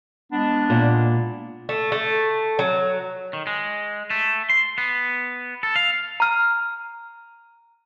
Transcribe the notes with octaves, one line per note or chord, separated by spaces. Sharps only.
G#3 B3 D4
A#2
A3
A3
F#3
D#3
G#3
A3
C6
B3
A4
F5
A#5 F6